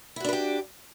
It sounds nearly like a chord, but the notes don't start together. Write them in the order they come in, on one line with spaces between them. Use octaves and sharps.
E4 F#4 D4 B4 G4